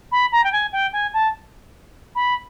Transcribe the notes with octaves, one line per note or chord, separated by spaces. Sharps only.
B5
A#5
G5
G#5
G5
G#5
A5
B5